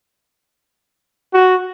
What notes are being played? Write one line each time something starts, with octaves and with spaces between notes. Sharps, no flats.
F#4